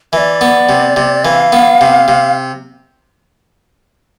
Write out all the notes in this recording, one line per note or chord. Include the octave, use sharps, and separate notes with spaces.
E3 D5 E5
B3
C3
C3
E3 F5
B3
C3
C3